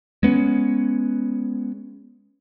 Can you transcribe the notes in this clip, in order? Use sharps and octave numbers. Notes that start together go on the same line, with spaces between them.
G#3 B3 C#4